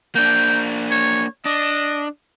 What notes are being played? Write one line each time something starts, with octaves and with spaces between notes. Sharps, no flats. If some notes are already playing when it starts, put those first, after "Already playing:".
A#3 D4 G5
C#5
D4 D#5